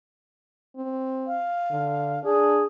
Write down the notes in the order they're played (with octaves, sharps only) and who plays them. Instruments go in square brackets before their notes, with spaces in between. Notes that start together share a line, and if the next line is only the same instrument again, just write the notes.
[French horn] C4
[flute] F5
[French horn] D3
[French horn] D4 [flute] G#4